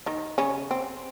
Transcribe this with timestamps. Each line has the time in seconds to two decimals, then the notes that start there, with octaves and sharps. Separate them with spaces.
0.06 D#3 D#4
0.38 C#3 C#4
0.71 C4